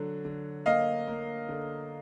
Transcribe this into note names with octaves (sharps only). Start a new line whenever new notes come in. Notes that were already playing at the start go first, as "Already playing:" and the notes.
Already playing: D3 F#3
D3
A#3 D#5 F5
A#3
D3